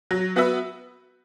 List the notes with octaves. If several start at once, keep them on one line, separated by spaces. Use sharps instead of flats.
F#3
B3 F#4 B4 E5